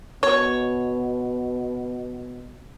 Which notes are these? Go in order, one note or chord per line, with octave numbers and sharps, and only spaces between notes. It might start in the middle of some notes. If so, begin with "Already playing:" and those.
B2 C#5